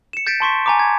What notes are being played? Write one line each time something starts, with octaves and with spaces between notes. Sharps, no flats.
C#7 E7
G6 A6 B6 D7
A5 C6 C#6 B6
G#5 A#5 D6
G#6